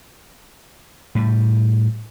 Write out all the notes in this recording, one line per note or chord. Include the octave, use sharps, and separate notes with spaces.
A2 G3